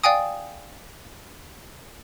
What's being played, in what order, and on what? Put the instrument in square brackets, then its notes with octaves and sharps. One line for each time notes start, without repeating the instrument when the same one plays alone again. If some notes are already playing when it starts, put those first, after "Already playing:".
[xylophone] D5 F5 G5 G#5 D#6